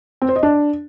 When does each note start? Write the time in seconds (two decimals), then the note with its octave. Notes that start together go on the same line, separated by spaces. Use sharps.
0.22 C4
0.29 C5
0.36 D#5
0.43 D4